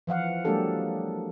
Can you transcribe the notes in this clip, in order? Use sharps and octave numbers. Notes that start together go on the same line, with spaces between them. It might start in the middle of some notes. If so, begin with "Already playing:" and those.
E3 F3 F5 F#5
F#3 G#3 A#3 D4 G4 A4